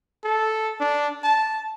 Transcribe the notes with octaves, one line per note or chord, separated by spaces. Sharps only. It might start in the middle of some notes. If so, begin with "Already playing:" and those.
A4
D4
A5